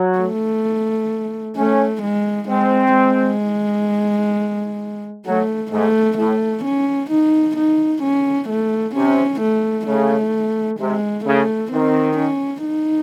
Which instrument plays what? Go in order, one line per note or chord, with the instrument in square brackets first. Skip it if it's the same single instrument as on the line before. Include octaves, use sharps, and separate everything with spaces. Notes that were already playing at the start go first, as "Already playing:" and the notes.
Already playing: [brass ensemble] F#3
[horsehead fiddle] A3
[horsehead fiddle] A3 [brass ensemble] C#4
[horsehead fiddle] G#3
[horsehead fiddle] G#3 [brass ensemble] C4
[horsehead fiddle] G#3
[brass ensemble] F#3 [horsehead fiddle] A3
[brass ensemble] G#2 [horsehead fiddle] A3
[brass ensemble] A2 [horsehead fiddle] A3
[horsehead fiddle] C#4
D#4
D#4
C#4
A3
[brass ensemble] C3 [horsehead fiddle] C#4
[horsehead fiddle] A3
[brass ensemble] C#3 [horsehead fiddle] A3
[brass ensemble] C3 [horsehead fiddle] G#3
[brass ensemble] C#3 [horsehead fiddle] A3
[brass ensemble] D#3 [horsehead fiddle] C4
[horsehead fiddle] C#4
D#4